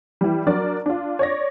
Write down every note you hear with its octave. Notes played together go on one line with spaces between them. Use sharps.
E3 G3
F#3 D4 F#4 A#4 D5
D4 F4
C#5 D5 A#6